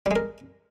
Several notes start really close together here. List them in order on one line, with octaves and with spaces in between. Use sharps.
G3 G#3 A#4